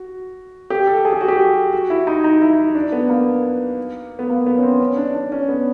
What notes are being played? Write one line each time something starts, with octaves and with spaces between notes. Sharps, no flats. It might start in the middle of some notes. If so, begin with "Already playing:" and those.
Already playing: F#4
G4
A4
G#4
G4
F#4
G4
F#4
E4
D#4
D#4
E4
D4
B3
A#3
B3
A#3
B3
C#4
C4
C#4
D4
D4
C#4
B3